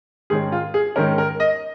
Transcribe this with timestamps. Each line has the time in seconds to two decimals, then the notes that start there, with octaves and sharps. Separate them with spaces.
0.30 G#2 D#3 G#3 C#4 G#4
0.52 F4
0.74 G#4
0.96 G#2 D#3 G#3 C#4 A#4
1.18 A#4
1.40 D#5